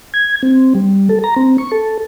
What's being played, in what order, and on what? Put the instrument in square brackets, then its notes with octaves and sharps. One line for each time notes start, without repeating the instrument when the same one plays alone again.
[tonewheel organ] G#6
C4
G3
A4
A#5
C4
C#6
A4